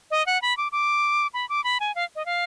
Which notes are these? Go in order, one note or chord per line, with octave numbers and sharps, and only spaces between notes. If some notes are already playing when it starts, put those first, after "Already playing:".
D#5
F#5
B5
D6
D6
B5
D6
B5
G#5
F5
D#5
F5